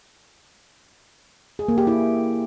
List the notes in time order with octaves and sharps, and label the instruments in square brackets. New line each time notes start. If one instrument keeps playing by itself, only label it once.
[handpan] G#4
A#3
G4
E4